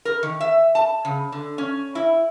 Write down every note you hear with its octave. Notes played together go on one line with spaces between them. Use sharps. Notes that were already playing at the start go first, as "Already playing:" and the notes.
A#4
D#3
E5
A5
C#3
D3
C#4
E4